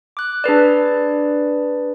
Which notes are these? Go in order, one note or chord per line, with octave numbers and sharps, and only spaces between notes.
D6 F#6
D4 G#4 B4 D5